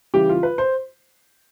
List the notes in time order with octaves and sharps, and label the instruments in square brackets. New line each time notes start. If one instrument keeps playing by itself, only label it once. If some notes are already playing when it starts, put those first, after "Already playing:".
[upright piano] C#3 E3 G3 G4
F4
B4
C5